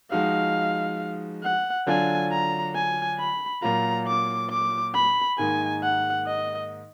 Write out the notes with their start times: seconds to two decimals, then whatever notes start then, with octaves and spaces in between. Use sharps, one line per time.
0.11 F3 G#3 D#4 F#4 F5
1.43 F#5
1.87 D3 F#3 D4 F4 G#5
2.31 A#5
2.75 G#5
3.19 B5
3.62 A#2 F#3 A#3 F4 A#5
4.07 D6
4.50 D6
4.94 B5
5.38 G#2 D#3 A#3 D#4 G#5
5.83 F#5
6.27 D#5